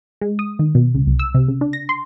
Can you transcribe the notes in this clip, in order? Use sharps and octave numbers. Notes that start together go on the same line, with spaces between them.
G#3
D#6
D#3
B2
C#2
C2
E6
C3
C#3
D4
A#6
C6